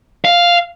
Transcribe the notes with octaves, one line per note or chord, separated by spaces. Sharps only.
F5